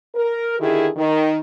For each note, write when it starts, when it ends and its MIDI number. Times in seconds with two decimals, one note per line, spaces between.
0.15 0.55 70
0.59 0.89 50
0.59 0.89 51
0.59 0.89 64
0.59 0.89 67
0.59 0.89 68
0.96 1.39 51